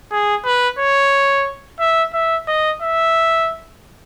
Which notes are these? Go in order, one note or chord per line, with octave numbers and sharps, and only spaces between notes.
G#4
B4
C#5
E5
E5
D#5
E5